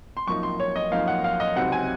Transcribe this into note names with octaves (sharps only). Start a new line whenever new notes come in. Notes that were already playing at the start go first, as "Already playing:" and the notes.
C6
F#2 F3 A#3 D#4 C#6
C6
C#5
D#5
F#2 F3 A#3 D#4 F5
F#5
F5
D#5
C#2 C3 F#3 C4 D#4 F#5
G#5